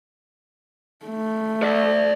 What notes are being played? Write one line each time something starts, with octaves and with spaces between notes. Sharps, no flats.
A3
D5 E5